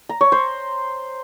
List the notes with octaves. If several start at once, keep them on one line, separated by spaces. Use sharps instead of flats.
A#5
C#5
C5